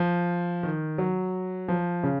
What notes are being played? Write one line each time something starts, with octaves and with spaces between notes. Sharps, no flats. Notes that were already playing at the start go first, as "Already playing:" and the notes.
Already playing: F3
D#3
F#3
F3
C#3